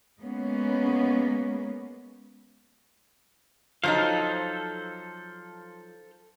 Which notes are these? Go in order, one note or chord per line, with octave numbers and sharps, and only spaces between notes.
G#3 A#3 B3 C#4
F3 F#3 D#4 A4 C5 F5